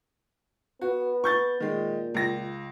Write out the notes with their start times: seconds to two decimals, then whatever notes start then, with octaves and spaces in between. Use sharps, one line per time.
0.81 B3 F#4
1.24 C#6 G6 A6
1.60 A#2 D#3 G#3
2.14 C#2 A#6